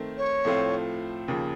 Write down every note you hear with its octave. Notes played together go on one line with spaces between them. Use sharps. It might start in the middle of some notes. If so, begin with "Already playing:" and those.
Already playing: D#3 A3 C4
C#5
A2 F3 A3 C4 F4
D#2 C#3 F3